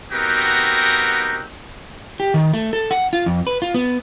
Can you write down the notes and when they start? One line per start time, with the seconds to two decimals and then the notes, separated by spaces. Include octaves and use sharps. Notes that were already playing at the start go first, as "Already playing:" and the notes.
0.11 B3 C4 D#4 F#4 G4 A#4
2.20 G4
2.34 D#3
2.54 A3
2.73 A4
2.91 F#5
3.13 F4
3.26 F2
3.47 B4
3.62 F4
3.74 B3